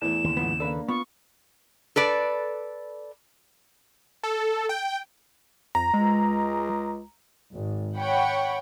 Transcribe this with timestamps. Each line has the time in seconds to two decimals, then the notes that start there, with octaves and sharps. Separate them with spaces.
0.01 E2 A2 E3 E7
0.24 D#2 C#3
0.37 G#2 F3 B3
0.60 A#3 D4 A4 B4
0.88 B3 F4 C#6
1.96 A4 B4 D5
4.24 A4
4.69 G5
5.75 F2 A#5
5.94 C#2 G#3
7.52 G#1
7.97 C#5 F#5 G5 B5 C#6